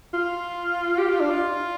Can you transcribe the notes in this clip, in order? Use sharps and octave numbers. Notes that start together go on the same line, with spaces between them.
F4
G4
F4
D4
F4